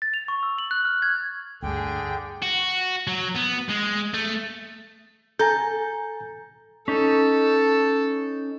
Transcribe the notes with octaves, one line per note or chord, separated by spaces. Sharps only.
A6
F7
C#6
E6
F#7
F#6
F6
G#6
D2 G2 D3 G#4 G5
F#4
F#3
B3
G#3
A3
A4 G#5 A#5 G6
C#4 D#4 A4